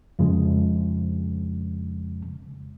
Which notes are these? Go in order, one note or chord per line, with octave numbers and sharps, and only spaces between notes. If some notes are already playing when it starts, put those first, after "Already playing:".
F2 C#3 F3 G#3